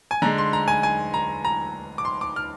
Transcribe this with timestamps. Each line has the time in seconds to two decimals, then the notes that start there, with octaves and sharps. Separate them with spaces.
0.11 G#5
0.22 D3 A#5
0.26 G#3
0.38 C6
0.53 A#5
0.68 G#5
0.83 G#5
1.14 A#5
1.45 A#5
1.98 D6
2.05 C6
2.21 D6
2.36 F6